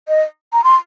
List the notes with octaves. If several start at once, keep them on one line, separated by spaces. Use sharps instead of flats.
D#5
A#5
C6